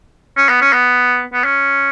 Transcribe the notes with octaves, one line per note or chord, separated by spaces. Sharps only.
C#4
B3
C#4
B3
B3
C#4